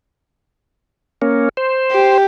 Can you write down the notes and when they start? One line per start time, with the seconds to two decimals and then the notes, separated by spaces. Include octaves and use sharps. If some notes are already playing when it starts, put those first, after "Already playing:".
1.22 A#3 C#4
1.57 C5
1.91 G4